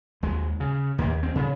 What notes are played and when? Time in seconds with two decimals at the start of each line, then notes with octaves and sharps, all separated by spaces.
0.23 D#2 G#3
0.60 C#3
0.98 D#2 A#3
1.23 C4
1.35 C#3